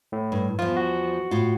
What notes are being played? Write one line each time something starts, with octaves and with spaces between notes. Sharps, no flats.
A2
G2
E2 F3 F4
F#4
A2 F4